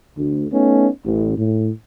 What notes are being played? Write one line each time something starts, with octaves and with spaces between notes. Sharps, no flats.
D2
A3 B3 C#4 D#4
A1
A2